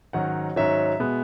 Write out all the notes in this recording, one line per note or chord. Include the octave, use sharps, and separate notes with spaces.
G#2 D#3 F#3 C#4 F#5
G#2 D#3 F#3 C#4 E5
B2 G#3 B3